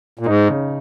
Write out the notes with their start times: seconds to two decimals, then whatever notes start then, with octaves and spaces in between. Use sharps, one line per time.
0.19 A#2
0.26 G#2 D#4
0.50 C#3